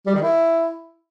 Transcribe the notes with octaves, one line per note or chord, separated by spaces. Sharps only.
G3
D#3
E4